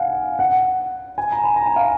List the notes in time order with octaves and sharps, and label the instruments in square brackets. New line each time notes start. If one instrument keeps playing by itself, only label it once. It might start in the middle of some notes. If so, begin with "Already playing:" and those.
Already playing: [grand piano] F5 F#5 G#5
F#5
G#5
A#5
B5
A#5
G#5
F5